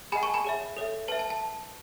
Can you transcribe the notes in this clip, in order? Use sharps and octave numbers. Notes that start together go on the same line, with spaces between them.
G#4 D#5 F#5 G#5 B5
A5 C#6
G#5 B5
G#4 C#5 E5
A4 C#5 E5
B4 E5 A5
A5
A5